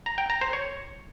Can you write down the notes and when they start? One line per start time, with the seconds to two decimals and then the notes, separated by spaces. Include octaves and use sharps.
0.06 A#5
0.18 G5
0.30 A#5
0.41 C5
0.53 C#5